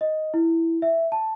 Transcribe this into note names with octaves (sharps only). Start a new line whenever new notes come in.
D#5
E4
E5
A5